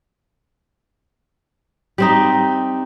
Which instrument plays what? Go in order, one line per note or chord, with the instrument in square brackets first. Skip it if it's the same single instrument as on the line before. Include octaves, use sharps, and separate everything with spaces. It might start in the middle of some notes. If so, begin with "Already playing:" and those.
[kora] G3 C4 D#4